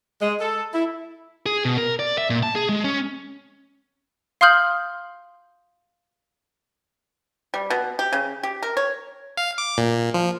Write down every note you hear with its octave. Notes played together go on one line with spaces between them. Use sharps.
G#3
A4
E4
G#4
B2
A#4
D5
E5
A#2
A5
G#4
G#3
C#4
F5 C6 D#6 F6 G6 F#7
G3
B2
G4
C#3
G4
A#4
C#5
F5
D6
A#2
F3